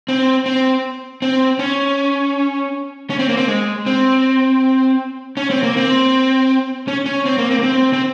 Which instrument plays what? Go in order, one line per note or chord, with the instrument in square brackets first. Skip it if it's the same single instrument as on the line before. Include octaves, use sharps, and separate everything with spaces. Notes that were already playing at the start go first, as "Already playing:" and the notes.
[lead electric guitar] C4
C4
C4
C#4
C#4
C4
A#3
C4
G#3
C4
C#4
C4
A#3
C4
C#4
C#4
C4
A#3
C4
A#3
C4
C4